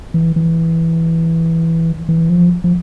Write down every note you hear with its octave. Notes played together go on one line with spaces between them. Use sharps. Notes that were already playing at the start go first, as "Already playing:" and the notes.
E3
E3
E3
F3
F3